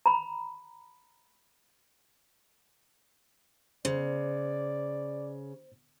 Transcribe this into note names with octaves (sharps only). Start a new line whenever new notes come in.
A#5 B5
C#3 C5 D5